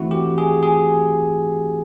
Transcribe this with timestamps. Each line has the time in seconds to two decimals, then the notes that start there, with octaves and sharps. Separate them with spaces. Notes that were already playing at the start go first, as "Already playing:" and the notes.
Already playing: E3 A3 C4 E4 F#4
0.11 G4
0.38 G#4
0.63 G#4